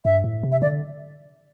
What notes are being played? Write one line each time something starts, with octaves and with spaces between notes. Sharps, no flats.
G2 E5
A2
C3
E5
D3 D5